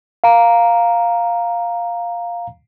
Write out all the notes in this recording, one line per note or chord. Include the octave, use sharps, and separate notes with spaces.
F5 A#5